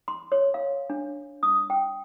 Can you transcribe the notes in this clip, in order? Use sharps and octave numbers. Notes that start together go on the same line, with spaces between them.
C6
C#5
F5
D4
D#6
G5